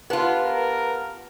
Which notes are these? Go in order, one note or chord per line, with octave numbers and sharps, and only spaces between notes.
B3 F4 G4 B4 A5
A#4